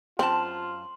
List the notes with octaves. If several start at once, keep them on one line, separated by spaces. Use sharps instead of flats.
F#2 C4 F4 A5 C6 F#7